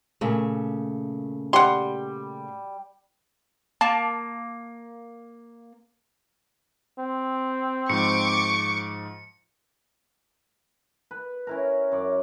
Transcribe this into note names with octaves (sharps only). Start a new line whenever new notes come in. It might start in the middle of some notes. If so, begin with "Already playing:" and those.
A#2 C#3 A3
G3 F#5 C6
A#3 A5
C4
G#2 F3 C#6 D6 C#7
B4
C#4 E4 A#4
F#2 C#5 D5